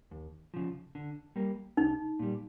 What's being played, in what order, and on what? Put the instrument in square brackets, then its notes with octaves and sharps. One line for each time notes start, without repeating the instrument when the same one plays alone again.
[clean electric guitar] D#2
C#3 F3
D3
G3 A#3
[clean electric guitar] C2 [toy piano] D#4
[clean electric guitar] A#2 G3